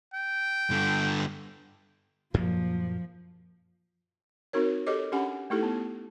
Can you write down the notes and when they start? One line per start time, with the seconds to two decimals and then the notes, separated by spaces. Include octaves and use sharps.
0.14 G5
0.70 G2 D3
2.34 F#2 A#2 F3 A#3
4.53 C4 D#4 F#4 A#4 C#5
4.87 G4 A4 C#5 D#5 D6
5.12 C#4 D4 G4 F#5 G#5
5.50 A3 D#4 E4 G4 A4
5.63 B3